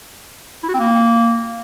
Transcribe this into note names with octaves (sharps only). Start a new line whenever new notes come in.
E4
F#4
C4
A#3